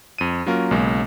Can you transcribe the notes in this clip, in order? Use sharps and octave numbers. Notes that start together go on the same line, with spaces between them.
F2 D#7
F#3 A#3 C#4 F4 A#4
B1 C#3 G#3 A#3